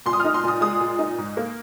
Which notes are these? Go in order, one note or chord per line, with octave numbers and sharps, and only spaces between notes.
A#2 C6
D#6
D#4 F6
C6
A#2 D#6
G#3 D#6
A#2
D#4
G#2
A#3